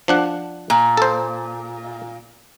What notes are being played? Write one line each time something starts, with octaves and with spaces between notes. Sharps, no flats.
F3 D4 F#5
A#2
A4 C5